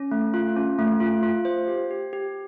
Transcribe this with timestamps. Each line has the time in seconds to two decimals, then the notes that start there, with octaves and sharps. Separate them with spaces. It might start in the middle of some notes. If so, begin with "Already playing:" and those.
Already playing: C#4
0.11 A3
0.34 F4
0.56 C#4
0.79 A3
1.00 F4
1.23 F4
1.45 C5
1.68 G4
1.91 G4
2.13 G4